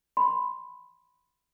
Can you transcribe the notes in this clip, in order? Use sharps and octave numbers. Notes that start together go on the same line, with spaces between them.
B5 C6